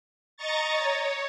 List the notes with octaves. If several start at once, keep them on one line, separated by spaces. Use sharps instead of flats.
D#5 A#5 C#6 A6
C#5